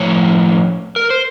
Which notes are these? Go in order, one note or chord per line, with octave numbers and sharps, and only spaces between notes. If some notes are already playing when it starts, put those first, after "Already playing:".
Already playing: A2 F3 C#5
A#4
C5